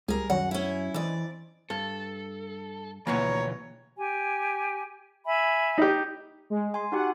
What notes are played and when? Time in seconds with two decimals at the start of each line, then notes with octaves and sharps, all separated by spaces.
0.08 C#2 G3 G#4 A#4
0.30 F#2 D#3 F#3 G3 F#4 F#5
0.51 C#4 E4
0.94 F2 E3 D5 D#5
1.70 G2 A4
3.07 D2 B2 E3 F3 A#3 B3 C#5 A#5
3.97 G4 G#5
5.26 E5 G#5 B5
5.78 D#4 G4
6.50 G#3
6.74 G#5 C6
6.92 D#4 F#4 G4 F#5